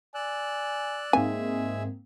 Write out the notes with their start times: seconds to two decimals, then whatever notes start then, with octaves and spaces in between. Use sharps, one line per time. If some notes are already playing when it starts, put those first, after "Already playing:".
0.15 D5 G#5 E6 F#6
1.13 G#2 G#3 A#3 C4 G#4 E5 G#5